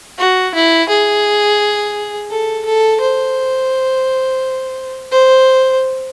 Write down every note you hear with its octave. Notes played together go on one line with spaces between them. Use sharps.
F#4
E4
G#4
A4
A4
C5
C5